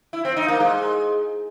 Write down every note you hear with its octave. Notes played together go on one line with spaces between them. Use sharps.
E4
C4
D#4
A#3
G#3